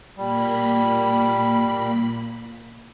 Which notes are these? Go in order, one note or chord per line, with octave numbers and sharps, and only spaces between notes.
A#2 G3 A#3 B5